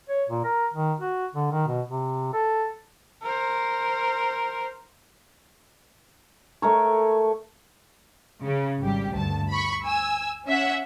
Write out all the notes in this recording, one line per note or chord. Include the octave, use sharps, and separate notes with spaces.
C#5
A#2
A#4
D#3
F#4
D3
D#3
B2
C3
A4
A#4 C5
A3 A#4 C#5
C#3
G#1 G3 G4
D2 G2 A5
B5 C#6
G#5 E6
C#4 E5 F#5